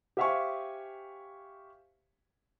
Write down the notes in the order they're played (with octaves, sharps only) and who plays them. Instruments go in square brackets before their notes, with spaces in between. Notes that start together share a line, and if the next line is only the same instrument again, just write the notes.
[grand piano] G4 C5 E5 F5 G#5 C#6